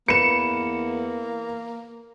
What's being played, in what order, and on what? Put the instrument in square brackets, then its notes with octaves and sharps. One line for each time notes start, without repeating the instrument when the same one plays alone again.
[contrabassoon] E2 [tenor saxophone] A#3 [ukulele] B4 [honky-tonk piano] C#7 E7